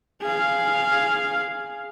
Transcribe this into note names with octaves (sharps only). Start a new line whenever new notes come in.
G#4 F5